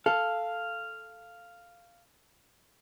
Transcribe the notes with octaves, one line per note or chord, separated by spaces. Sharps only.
A4 F5